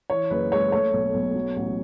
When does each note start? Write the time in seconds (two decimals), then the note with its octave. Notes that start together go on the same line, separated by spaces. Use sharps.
0.10 E3 C#5
0.31 F#1 B4
0.52 G#3 C#5
0.72 A3 C#5
0.93 B1
1.14 B1
1.35 F#3
1.56 A1